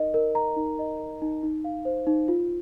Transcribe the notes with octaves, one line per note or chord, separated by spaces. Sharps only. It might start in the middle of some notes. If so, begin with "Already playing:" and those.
Already playing: D#4 A#4 D#5
A#4
A#5
D#4
D#5
A#4
D#4
D#4
F5
C5
D#4
F4